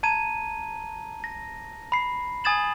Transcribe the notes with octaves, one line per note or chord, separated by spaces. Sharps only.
A5 A#5 G#6 D#7
A#6
B5 C7
G#5 D#6 G#6 A6 E7 F#7